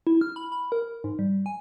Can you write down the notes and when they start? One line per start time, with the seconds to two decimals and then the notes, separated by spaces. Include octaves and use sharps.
0.07 E4
0.21 F6
0.36 B5
0.52 B5
0.72 A#4
1.04 G#2
1.19 G3
1.46 G#5